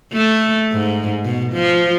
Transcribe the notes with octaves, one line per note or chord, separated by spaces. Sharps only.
A3
G#2
B2
F3